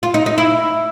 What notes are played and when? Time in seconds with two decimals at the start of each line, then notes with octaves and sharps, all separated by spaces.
0.03 F4
0.14 D#4
0.26 D#4
0.38 E4